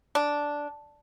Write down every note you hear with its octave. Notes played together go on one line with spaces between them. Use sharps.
D4